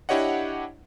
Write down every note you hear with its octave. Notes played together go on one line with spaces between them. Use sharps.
D4 E4 G4 C#5 D#5 F#5